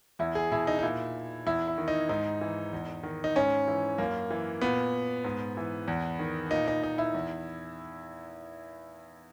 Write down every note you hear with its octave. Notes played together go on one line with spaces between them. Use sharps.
E2 E4
G#4
B2 E4
D#4
D#4
A#2 E4
E2 E4
E4
D#3
D#4
G#2 D#4
E3
E2
D#3
D#4
G#2 C#4
E3
F#2 A#3
E3
A#2 B3
G#2
E3
E2
D#3
A#2 D#4
D#4
D#4
E4
E2